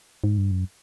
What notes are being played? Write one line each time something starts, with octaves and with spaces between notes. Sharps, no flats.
G#2
G2
F#2